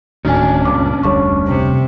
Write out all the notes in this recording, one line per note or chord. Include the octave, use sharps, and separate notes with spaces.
D1 A2 D#3 C#4 D4 F#4 G#5
C#2 G2 A#2 D6
F1 D2 G3 C#5 C#6
C3